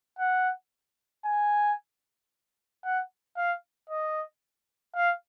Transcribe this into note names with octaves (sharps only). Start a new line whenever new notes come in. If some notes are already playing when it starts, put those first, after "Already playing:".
F#5
G#5
F#5
F5
D#5
F5